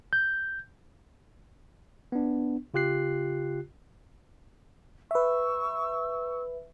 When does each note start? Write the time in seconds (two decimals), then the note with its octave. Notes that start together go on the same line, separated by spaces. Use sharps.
0.13 G6
2.12 B3 D4
2.74 C#3 F4 G4 F#6 C7
5.11 B4 E5 C#6 E6